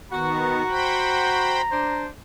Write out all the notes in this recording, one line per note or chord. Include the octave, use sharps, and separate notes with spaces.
D#3 B3 F#4 A#5
C5 G5 B5
D4 C5